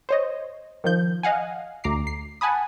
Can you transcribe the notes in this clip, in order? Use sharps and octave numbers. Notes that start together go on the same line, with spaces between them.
C5 C#5 D#5
D#3 F3 G6
D#5 F5 F#5 G#5
D2 A#5 D6 C7
C7
F#5 G#5 A5 B5 D#6